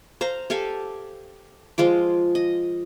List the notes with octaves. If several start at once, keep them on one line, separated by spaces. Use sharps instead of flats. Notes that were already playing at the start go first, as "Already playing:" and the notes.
C5 F5 A#5
G4 A4 F5 G#5
F3 G#3 F4 D6
D#5